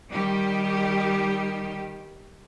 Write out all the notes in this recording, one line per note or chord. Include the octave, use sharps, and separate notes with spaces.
D#3 G3 G4